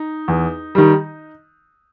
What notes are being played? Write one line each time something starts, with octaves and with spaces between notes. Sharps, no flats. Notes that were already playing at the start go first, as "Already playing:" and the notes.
Already playing: D#4
E2
D#3 G3